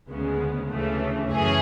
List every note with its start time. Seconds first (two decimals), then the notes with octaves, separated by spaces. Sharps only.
0.10 D2 C#3 G#3 B3
0.69 D2 C#3 E3 A3
1.29 F#2 E3 A3 C#4 G#4